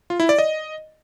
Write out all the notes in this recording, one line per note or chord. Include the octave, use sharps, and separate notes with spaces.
F4
E4
D5
D#5